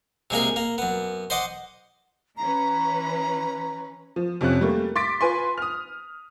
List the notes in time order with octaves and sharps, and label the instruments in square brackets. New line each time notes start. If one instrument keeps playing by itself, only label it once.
[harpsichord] C3 G#3 A#3 G#4
A#3
F#2 B3
C5 D#5 F#5 C6 D6
[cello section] E3 C#4 B4 [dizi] A#5
[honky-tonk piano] F3
F2 C3 C#4 F4 F#6
G3 A3 A#3
C6 D6 A6 B6 D7
F4 B4 G#5 C6
D#6 F6